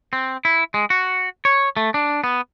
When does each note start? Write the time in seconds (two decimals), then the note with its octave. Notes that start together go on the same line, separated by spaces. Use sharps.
0.13 C4
0.45 E4
0.74 G#3
0.90 F#4
1.45 C#5
1.77 A3
1.94 D4
2.24 B3